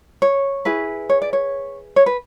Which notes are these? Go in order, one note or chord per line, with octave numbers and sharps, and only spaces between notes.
C#5
E4 G#4 B4
C#5
D5
C#5
C#5
B4